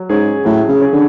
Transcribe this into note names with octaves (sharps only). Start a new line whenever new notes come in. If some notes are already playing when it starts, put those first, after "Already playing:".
Already playing: F#3
G#2 C#4 G#4
A2 F#3
C#3
C#4 G#4
D3